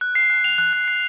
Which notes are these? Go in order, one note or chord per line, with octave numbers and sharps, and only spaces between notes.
F#6
C7
F#6
F7
F#6
F#6
C7